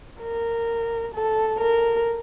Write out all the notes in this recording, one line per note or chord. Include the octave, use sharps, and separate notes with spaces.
A#4
A4
A#4